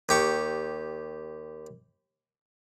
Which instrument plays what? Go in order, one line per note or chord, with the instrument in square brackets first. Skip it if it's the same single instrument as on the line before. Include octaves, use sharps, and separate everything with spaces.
[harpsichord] D#2 G4 C#6